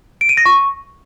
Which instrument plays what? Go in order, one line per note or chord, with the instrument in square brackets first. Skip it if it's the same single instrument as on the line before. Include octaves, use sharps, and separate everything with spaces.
[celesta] D7
D#7
A#6
C#6